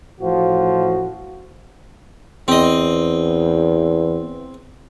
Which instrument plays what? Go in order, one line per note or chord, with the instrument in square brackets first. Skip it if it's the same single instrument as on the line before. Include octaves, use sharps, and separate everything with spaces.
[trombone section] A1 A2 F3 F#4
[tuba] E2 [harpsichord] C4 D#5